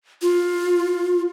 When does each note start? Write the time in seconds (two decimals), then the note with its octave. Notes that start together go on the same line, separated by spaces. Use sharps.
0.22 F4